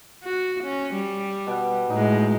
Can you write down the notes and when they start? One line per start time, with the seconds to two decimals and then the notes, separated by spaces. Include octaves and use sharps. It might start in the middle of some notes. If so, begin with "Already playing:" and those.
0.23 F#4
0.64 C#4
0.94 G3
1.47 B2 F#5
1.90 A2 G#3 D#4